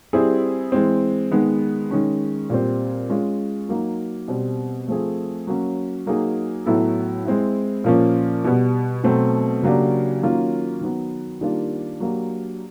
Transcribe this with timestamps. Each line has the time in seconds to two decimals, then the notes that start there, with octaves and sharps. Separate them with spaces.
0.13 G3 C4 E4 G#4
0.72 E3 G#3 C4
1.32 D#3 G#3 B3
1.91 D#3 G#3 C#4
2.50 A#2 G3 C4
3.09 G#3 C#4 F4
3.69 F#3 A#3 D#4
4.28 B2 G3 C4
4.88 F3 A3 C4 F4 G#4
5.47 F#3 A#3 C#4
6.06 F#3 A#3 D#4 G#4
6.66 A2 F#3 B3 E4 A4
7.25 G#3 C4 E4
7.84 A#2 F3 A#3 C#4
8.44 B2 G3 B3
9.04 B2 F#3 A3 C4
9.63 C#3 F#3 A#3 D4 G4
10.22 D#3 F#3 A#3 C#4 F4
10.81 D#3 F#3 B3
11.41 D#3 G3 A#3 D4 F4
12.00 F#3 A#3 D4 G4